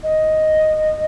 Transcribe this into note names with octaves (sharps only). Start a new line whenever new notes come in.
D#5